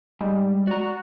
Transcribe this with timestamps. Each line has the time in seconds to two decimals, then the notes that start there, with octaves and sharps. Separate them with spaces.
0.21 G#2 G3 G#3
0.67 F#4 D5 A#5